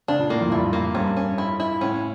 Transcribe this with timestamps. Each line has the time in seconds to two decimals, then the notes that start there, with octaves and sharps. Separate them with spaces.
0.08 C#3 D4
0.19 A#2
0.30 A2 A#3
0.41 F2
0.48 G2
0.52 F2 E4
0.73 A#3
0.95 G2 C#4
1.17 C#4
1.38 E4
1.60 E4
1.81 A2 C#4